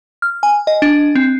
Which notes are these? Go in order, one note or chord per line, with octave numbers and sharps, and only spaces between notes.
F6
G#5
D#5
D4
C4